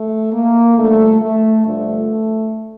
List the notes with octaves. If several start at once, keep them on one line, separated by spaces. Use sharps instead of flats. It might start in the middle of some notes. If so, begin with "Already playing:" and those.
Already playing: A3
A#3
G2 D3 F3 A3
A3
G2 D3 F3 A3